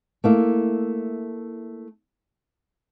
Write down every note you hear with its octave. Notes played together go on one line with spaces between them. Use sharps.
A3 A#3 E4